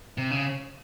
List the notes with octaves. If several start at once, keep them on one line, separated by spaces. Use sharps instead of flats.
C3
C#3